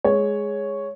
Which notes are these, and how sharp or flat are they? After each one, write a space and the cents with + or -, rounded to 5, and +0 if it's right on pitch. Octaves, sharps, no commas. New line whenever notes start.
G#3 +0 C#5 +0